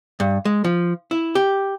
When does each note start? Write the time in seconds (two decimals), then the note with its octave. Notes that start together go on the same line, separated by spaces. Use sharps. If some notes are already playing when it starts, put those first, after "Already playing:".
0.20 G2
0.45 G#3
0.64 F3
1.11 E4
1.35 G4